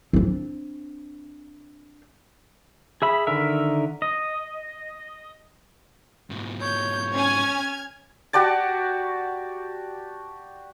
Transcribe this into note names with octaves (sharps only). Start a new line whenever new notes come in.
C4 D4
G#4 E5 B5
D3 D#3 A#4 E5
D#5
G#2 B2
C#5 G6
C#4 G#5 F6 G#6
F#4 G4 D5 A5